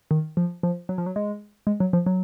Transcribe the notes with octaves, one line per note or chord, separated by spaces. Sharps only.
D#3
F3
F3
F#3
F3
F#3
G#3
G#3
F#3
F3
F#3